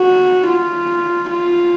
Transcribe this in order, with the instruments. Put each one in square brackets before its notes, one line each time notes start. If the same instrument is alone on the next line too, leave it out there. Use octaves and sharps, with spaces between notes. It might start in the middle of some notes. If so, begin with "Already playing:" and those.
Already playing: [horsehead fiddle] F#4
F4
F4